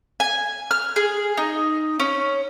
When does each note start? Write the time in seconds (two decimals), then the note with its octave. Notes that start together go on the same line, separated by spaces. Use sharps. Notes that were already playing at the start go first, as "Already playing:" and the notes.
0.20 G#5
0.71 F6
0.96 G#4
1.37 D#4
2.00 C#4